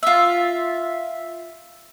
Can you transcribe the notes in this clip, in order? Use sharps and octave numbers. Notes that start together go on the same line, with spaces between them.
F4 E5